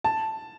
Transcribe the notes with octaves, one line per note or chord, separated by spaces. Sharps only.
A5